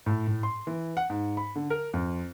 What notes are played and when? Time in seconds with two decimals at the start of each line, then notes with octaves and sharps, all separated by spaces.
0.06 A2
0.27 A2
0.43 C6
0.67 E3
0.97 F#5
1.10 G#2
1.37 B5
1.56 D3
1.70 A#4
1.93 F2